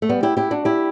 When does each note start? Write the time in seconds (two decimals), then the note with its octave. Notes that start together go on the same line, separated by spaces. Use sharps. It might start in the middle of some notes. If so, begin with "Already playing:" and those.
0.02 A3
0.09 G3 B3
0.23 E4 G4
0.37 E4 G4
0.51 D4 F#4
0.65 E4 G4